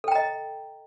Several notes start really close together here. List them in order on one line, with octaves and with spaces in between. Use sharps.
A4 G5 A#5 D#5